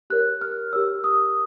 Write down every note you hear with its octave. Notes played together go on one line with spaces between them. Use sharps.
G4 A#4 C#5 F#6
F6
G4 A#4 C#5 E6
D#6